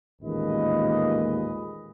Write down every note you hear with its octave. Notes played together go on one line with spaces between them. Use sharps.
A1 D#2 A#2 G#3 B4 D#5